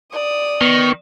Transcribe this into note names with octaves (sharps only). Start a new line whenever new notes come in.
D5 D#6
D#3 B3 C#6